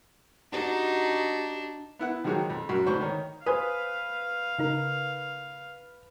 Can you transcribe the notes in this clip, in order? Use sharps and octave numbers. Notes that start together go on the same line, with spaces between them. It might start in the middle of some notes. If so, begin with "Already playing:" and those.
D4 D#4 F#4 G4
B3 E4 F#5
D#3 F3 F#3 G#3 F#4 G4
F2
F#2 F#4
D2 G#2 C5 B5 C#6
D#3 A#4 C#5
B4 C5 F5 G#5 D#6
C#3 D#4 A#4